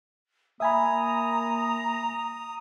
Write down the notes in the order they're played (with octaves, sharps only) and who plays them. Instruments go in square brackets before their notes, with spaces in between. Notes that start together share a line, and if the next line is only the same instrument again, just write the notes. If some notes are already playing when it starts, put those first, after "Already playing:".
[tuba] A#3 [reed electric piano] E5 G#5 B5 [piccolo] A#5 [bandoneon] D#6